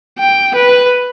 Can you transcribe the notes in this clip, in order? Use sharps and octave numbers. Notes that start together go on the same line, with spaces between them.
G5
B4